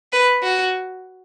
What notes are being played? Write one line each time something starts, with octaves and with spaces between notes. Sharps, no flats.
B4
F#4